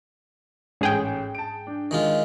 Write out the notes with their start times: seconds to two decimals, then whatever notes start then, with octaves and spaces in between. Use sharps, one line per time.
0.81 A1 G#2 G#4 G5
1.35 A5 D7
1.67 D4
1.91 D#3 G#3 F4